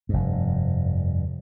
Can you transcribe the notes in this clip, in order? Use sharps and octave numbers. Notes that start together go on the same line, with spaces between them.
F1 G2